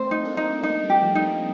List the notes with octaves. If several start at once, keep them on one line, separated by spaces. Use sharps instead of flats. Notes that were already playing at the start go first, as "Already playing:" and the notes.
Already playing: A3 C4 C5
D#4
A#3 D4
D#4
C4
A#3 D4 D#4
G3 A#3
G4
F3 A3
D#4
F3 A3